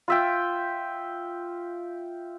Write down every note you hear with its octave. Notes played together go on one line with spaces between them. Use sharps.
F4 E5 G5